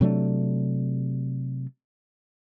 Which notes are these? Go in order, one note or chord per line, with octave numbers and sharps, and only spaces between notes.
C3 F#3 A3 D4